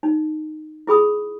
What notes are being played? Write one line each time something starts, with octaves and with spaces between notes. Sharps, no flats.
D#4
E4 G#4 B5 D#6